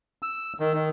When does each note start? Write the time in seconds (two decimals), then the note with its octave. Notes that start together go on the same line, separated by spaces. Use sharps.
0.23 E6
0.60 D#3
0.74 D#3